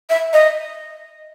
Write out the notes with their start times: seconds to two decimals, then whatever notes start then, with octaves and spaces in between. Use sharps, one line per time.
0.10 E5
0.33 D#5